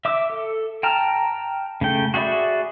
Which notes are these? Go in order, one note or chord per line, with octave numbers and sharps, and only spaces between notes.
E5 D6 E6
A4
G5 A5 A#5 F6
C#3 A3 G5
F#4 G#4 D5 E5 B5